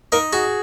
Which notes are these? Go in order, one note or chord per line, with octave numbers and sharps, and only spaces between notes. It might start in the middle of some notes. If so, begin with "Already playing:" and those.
D#4 A#4
F#4 G#4